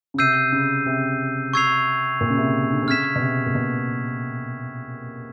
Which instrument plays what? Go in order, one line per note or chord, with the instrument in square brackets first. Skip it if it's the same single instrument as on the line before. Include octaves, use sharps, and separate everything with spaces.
[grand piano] C#3
[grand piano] C3 [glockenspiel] E6 G6 C7 D#7
[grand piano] C#3
C3
[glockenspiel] C#6 E6 G#6 C7 F7
[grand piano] A#2
C#3
C3
D3
C3
[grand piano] C#3 [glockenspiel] F6 G#6 B6 E7
[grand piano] B2
C3
A#2
B2